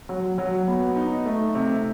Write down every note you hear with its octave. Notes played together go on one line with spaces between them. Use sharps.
F#3
F#3
B3
D#4
A3
C3